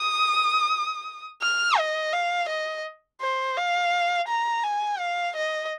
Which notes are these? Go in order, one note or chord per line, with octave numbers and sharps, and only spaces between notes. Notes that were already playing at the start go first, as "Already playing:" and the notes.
Already playing: D#6
F6
D#5
F5
D#5
C5
F5
A#5
G#5
F5
D#5